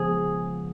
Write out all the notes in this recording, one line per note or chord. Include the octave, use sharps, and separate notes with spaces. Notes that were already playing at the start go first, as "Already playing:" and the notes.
Already playing: C#3 F3 G#3 B3 G#4